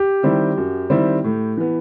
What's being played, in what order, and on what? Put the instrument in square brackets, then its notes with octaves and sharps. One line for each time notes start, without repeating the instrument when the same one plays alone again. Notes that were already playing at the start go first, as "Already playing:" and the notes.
Already playing: [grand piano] G4
[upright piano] D#3 G3 C4 E4
F#2
D#3 G3 C4 E4
A2
E3 B3